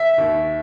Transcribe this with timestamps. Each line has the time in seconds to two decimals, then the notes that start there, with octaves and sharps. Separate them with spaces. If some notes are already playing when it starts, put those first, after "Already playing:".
Already playing: E5
0.18 D#2